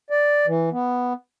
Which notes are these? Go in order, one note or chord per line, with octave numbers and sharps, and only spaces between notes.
D5
E3
B3